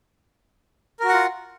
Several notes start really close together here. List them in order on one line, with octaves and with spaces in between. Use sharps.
A#4 F#4 F#5 F4